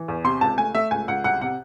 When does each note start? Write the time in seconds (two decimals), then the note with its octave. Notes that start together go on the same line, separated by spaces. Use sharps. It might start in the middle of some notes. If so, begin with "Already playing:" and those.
Already playing: E3
0.08 E2
0.24 C3 C6
0.41 C#2 A5
0.58 A3 G#5
0.75 A3 E5
0.91 C#2 G#5
1.08 C#2 F#5
1.24 C2 F#5
1.41 C3 F#5